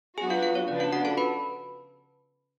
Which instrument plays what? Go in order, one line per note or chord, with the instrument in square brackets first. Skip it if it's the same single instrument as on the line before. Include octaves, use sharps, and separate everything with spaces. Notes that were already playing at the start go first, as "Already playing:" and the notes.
[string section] F#3 B3 D4 F#4 [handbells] G#4 G#5
[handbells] F4 F5
F4 F5
C#5
[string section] C#3 F3 B3 D4 [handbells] D5
[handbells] F4 F5
F#4 F#5
A4 A5
B4 B5